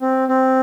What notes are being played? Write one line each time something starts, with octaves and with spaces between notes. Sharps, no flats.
C4
C4